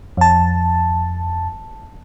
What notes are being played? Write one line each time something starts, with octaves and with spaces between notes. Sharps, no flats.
F2 A5